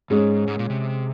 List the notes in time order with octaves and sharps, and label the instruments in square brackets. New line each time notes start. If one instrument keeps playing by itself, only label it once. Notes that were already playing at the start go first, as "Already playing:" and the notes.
[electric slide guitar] G#2 [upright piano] G#3 C#4 G#4
[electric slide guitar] G#2
A#2
C3